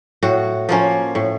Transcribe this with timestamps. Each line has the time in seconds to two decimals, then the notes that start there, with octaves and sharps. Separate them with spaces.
0.23 A2 F#4
0.69 F3 A#3 C#4
1.15 A2